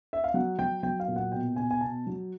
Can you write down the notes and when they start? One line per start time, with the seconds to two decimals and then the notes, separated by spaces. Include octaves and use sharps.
0.13 E5
0.24 F5
0.34 F#3 F#5
0.59 F#3 G5
0.83 F#3 G5
1.00 F5
1.08 A#2
1.16 F#5
1.32 B2 G5
1.56 B2 G#5
1.71 G#5
1.81 B2 A5
2.07 F#3